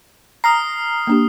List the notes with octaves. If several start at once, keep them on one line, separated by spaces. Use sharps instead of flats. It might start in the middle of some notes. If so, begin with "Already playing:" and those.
A#5 D#6 F6 C7
A#3 D4 G4